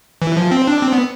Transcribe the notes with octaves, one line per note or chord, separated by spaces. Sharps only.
E3
F3
C4
D4
C4
B3